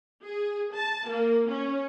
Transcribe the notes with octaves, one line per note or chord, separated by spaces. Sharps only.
G#4
A5
A#3
C#4